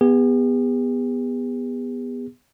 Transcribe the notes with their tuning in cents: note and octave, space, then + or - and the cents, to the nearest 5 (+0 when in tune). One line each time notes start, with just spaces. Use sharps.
B3 +0 G#4 -45